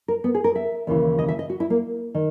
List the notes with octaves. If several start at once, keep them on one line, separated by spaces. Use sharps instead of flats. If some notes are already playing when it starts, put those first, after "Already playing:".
A#4
B3
G#4
A#4
E5
D#2 C#3 E3
D#5
E5
D#5
F#4
E4
A#3
D#3